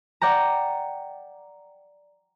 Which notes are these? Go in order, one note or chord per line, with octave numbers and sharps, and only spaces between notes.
D5 F#5 G5 A#5